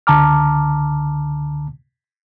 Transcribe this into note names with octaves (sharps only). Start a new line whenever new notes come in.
C#2 D3 A5 A#5 D6 F6